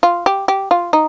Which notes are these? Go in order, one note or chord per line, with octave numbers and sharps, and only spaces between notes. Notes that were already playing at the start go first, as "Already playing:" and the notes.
F4
G4
G4
F4
D#4